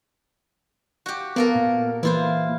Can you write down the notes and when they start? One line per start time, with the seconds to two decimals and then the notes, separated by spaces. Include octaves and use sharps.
1.06 F#4 G4
1.36 A#3 B3 A4 A#4
1.55 A#2
2.03 E3 A#3 E4 F4 B4 C5